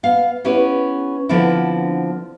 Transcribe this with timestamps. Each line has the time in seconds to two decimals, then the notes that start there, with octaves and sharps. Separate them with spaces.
0.03 B3 F5
0.45 B3 C#4 E4 G4 B4
1.29 D3 F3 B3 C4 D4 E4